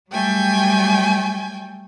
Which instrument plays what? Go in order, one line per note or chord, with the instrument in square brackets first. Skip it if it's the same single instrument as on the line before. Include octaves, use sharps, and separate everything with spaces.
[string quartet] F#3 G3 A3 G5 G#5 G6